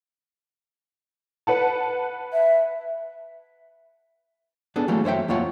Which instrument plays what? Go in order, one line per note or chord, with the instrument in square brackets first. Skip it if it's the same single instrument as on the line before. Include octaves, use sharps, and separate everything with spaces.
[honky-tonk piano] B4 F#5 A5
[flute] E5
[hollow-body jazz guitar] B3 D4 G#4 A4
E3 F#3 G3 A3 A#3
F#2 C5 C#5 E5 G5
F2 A#3 F4 C#5 F#5